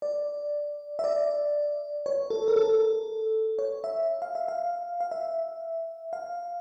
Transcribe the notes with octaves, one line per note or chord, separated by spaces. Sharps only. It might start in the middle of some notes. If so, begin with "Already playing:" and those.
D5
E5
D5
C#5
A4
A#4
A4
C#5
E5
F5
E5
F5
F5
E5
F5